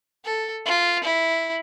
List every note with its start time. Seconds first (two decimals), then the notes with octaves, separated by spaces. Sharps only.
0.25 A4
0.66 F4
1.04 E4